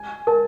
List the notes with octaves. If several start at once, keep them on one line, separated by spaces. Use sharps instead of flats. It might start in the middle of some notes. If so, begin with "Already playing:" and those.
Already playing: G#5
A#4 A5